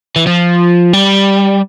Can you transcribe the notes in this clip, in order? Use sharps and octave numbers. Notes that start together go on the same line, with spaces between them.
E3
F3
G3